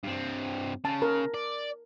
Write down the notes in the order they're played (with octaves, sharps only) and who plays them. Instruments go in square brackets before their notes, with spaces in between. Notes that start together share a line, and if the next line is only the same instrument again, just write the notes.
[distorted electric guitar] G2 C4
[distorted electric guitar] C#3 [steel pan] A5
[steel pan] A#4
[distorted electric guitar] D5